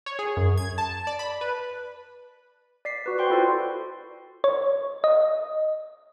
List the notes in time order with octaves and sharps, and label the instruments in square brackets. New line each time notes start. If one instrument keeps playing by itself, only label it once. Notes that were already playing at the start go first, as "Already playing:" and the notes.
[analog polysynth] C#5
G#4
F#2
G#6
A5
D5
B5
B4
[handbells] D5 B6 C7
F#4 B4
C5 G5 C6 C#6
E4 F4 A4 C5 D5
[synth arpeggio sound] C#5
D#5